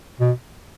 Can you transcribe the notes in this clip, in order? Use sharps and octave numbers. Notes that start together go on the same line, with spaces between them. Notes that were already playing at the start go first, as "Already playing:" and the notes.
B2